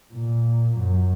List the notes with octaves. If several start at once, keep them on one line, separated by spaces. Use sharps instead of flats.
A#2
F#2